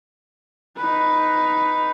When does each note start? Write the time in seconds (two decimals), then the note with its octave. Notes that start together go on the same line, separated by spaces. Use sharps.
0.77 D#4 B4